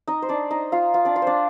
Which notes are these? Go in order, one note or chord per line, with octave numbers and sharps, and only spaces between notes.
D#4 D#5
C5
D4 D5
D#4 D#5
F4 F5
F4 F5
D4 D5
F4 F5
D4 C5 D5